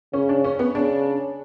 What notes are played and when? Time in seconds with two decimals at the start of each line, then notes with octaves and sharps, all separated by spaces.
0.13 C#3 C#4
0.29 D4
0.44 C#4
0.59 B3
0.75 C#3 D4